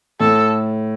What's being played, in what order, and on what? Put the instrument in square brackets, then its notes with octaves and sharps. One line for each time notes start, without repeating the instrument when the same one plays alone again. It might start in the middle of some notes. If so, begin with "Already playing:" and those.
[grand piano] A2 [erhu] A4